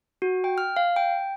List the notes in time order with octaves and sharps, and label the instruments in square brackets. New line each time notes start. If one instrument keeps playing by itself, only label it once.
[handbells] F#4
G5
F6
F5
G5